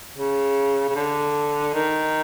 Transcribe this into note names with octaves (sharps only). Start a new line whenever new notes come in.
C#3
C#3
D3
D#3